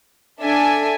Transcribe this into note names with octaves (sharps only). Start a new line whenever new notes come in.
D4 A4 E5 G#5